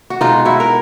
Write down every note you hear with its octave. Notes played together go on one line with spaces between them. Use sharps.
F#4
B2 G#3 D#4 F4
E4 F#4
A#4